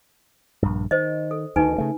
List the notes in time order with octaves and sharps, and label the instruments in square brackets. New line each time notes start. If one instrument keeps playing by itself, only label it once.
[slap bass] A#1 G2
[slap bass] D#3 [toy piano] C5 D#5
[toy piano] A4
[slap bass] D2 D#3 [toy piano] D#4 B4 G#5
[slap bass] C#3 A3